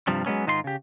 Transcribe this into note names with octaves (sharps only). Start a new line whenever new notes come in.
G2 C3 F3 G3
F#3 G#3 A#3 B3 C#4
G#2 D#3 D#4 F4 A4 C6
C#3 G4